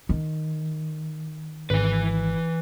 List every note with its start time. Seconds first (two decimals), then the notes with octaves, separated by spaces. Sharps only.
0.09 D#3
1.70 G#1 E3 B4